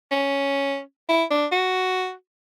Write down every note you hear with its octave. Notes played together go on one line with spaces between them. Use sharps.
C#4
E4
D4
F#4